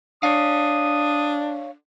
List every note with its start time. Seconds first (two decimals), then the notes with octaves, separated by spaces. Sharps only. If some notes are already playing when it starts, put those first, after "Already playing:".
0.23 D4 C#5 F5 D#6